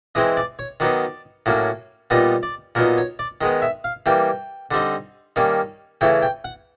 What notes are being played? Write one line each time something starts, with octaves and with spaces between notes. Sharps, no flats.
E3 G#3 C4 D#5
D5
C#5
D#3 F#3 B3 D#4 D5
A2 F#3 A#3 C#4
A#2 G3 B3 D#4 D#5
D5
A#2 F#3 B3 D#4 A#4
C#5
D5
D#3 G#3 B3 D#5
E5
F5
E3 G3 A#3 G5
D3 G3 C4 D#4
D#3 G3 A#3 C#4
C#3 E3 A3 C#4 G5
G5
F#5